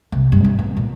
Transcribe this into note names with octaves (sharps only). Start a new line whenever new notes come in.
C2
G2
D#4
B3
A#2